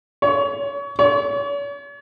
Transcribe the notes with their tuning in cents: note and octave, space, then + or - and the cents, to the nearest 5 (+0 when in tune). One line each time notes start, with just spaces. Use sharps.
C#5 +30
C#5 +45